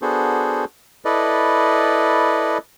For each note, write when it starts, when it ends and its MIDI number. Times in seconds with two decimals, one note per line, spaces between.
0.02 0.65 59
0.02 0.65 62
0.02 0.65 66
0.02 0.65 68
0.02 0.65 69
0.02 0.65 72
1.05 2.58 64
1.05 2.58 69
1.05 2.58 71
1.05 2.58 74
1.05 2.58 75